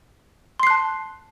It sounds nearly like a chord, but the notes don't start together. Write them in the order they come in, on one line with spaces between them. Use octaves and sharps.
C6 C7 F#6 A5